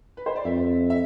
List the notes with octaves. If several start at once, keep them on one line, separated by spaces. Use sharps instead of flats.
B4
C5
D5
F2 E5
E5